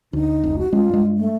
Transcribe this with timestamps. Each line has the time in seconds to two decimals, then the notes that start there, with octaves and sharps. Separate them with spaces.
0.13 D2 D#4
0.43 F1 C#2
0.59 F#4
0.73 G#3 C#4 F4
0.89 G2 G#3
1.18 A3